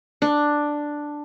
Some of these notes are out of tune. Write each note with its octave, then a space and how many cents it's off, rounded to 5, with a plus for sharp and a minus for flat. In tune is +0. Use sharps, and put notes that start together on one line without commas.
D4 +5